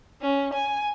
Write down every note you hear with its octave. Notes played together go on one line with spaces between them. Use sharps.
C#4
G#5